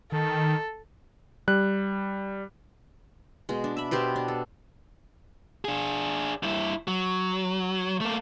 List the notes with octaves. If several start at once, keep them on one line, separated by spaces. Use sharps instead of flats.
D#3 A4
G3 F#6
B2 G#3
D4
E5 B5
B2 B3 G4 C5
D4
A4
D4 G#4
G2 E4
F#3
A3 A#3